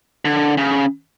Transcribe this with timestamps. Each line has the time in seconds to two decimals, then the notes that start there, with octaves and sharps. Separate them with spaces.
0.25 D3
0.57 C#3